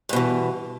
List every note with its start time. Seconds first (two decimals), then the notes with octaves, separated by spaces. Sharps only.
0.09 G2
0.13 B2
0.16 E3